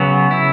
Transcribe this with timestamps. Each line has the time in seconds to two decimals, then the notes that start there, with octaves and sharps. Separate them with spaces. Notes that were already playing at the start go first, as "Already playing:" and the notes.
Already playing: C#3 F#3 B3
0.31 E4